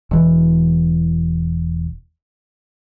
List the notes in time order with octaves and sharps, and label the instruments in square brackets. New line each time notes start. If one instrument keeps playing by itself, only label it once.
[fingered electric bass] E1 E3